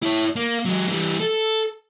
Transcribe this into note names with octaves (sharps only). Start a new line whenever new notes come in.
E4 C#5
A#3
F#3 G#3
E3 G3
A4